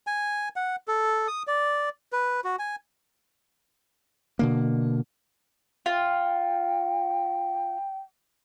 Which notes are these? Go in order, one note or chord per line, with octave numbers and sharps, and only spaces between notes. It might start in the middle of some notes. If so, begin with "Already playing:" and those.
G#5
F#5
A4
D#6
D5
B4
F#4
G#5
B2 D3 A#3
F4 G5